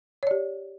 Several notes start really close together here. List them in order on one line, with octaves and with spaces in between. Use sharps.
C#5 D5 G4